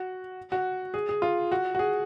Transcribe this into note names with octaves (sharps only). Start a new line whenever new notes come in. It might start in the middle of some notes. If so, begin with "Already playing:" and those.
Already playing: F#4
F#4
G#4
G#4
F4
F#4
F#4
G#4